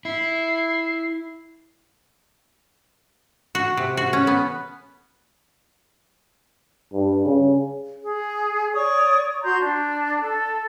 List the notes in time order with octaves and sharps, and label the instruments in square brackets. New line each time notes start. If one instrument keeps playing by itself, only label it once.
[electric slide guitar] E4 [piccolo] C7
[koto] F#4
C3
F#4
C#4
B3
[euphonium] G2
C#3
[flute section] G#4
C#5 D5 C#6 D#6
F#4 A#5 C6 G6
D4
A4